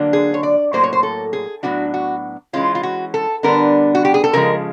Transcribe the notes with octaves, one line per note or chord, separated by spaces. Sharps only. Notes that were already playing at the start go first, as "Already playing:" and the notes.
Already playing: D3 F#3 A#3 D4
G#4
C#5
D5
A2 F#3 A#3 C5
C#5
C5
A4
G#4
A2 F#3 B3 D4 F#4
F#4
E3 G#3 C#4 F4
F4
F#4
A4
D3 G3 B3 D4 A#4
F#4
G4
G#4
A4
C#3 F3 G#3 A#4